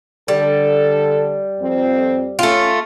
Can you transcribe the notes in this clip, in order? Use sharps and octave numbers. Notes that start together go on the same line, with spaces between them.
D3 G3 A4
F2 C4
A3 C#4 F4